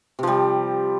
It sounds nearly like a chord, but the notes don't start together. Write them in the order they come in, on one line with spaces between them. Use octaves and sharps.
C3 F3 G3